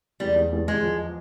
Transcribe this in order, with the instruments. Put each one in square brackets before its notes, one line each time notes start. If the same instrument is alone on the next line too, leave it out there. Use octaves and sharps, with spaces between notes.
[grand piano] E2 [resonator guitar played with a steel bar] G3
[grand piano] E2
E2
[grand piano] E2 [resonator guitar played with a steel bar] G#3
[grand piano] F3